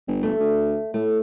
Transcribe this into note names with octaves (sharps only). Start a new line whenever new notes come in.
G1
A3
D2
A2 A3